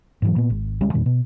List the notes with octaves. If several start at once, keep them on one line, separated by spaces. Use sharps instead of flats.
G#2 E3 F#3
A#2 B3
G#1
D2 G3 G#3 C#4
E2 A#2 D#3 G3
B2